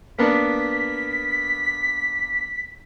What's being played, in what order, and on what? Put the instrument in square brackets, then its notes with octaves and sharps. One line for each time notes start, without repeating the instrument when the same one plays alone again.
[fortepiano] A#3 B3 D4 [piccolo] B6